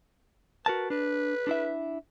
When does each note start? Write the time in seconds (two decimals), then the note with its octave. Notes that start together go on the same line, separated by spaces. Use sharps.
0.66 F#4 A#4 B4 A5
0.90 D4 B4
1.47 D4 E4 E5